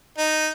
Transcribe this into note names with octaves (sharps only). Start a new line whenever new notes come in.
D#4